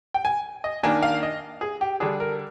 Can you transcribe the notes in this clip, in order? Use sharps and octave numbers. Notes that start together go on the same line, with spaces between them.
G5
G#5
D#5
D#3 A#3 D4 G#5
F5
D#5
G#4
G4
D3 G3 D4 G#4
A#4